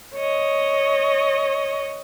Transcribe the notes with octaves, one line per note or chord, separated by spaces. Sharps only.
C#5 D#5